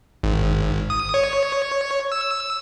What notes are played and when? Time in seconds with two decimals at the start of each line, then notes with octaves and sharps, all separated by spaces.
0.23 G#1
0.90 D#6
1.14 C#5
2.12 E6